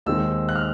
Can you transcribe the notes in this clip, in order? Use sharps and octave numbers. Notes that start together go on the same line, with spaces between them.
D#2 D#3 G#3 C4 E6
F#6
F6